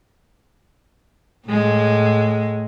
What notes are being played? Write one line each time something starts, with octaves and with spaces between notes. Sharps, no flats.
A2 G#3